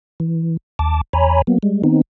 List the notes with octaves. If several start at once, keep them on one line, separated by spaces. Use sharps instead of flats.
E3
D#2 A5 D6
E2 C#5 G#5 A#5 B5
F#3 A#3 B3
G3 G#3
D#3 B3 C4 D#4